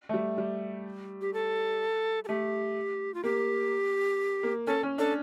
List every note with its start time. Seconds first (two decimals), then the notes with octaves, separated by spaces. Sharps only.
0.09 A3
0.14 G3
0.38 G3
1.21 G4
1.34 A4
2.24 A4
2.28 A3 G4
3.14 F4
3.24 A#3 G4
4.43 A#3
4.67 C#4 A4
4.83 C#4
4.98 D4 A4